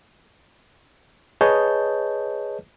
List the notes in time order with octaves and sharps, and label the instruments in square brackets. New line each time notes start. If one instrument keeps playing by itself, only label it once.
[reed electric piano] G#4 B4 C#5 D#5 A5 G6